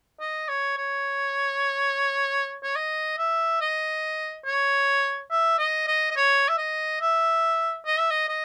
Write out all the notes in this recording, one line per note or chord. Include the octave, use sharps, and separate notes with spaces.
D#5
C#5
C#5
C#5
D#5
E5
D#5
C#5
E5
D#5
D#5
D#5
C#5
E5
D#5
E5
D#5
E5
D#5
D#5